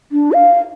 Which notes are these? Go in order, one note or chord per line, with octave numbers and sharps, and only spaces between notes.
D4
F5